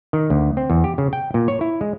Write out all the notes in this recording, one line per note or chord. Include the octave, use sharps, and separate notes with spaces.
D#3
D2
C4
E2
G4
C#3
G5
A#2
C#5
E4
G#3